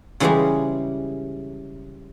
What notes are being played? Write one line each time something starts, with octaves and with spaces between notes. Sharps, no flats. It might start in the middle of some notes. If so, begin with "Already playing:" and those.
C#3 E3 G3 G#3 G4 G#4